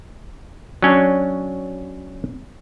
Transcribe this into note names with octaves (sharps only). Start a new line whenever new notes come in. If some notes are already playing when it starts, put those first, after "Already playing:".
F#3 C#4 D4